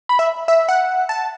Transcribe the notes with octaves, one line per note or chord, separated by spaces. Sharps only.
B5
E5
E5
F#5
A5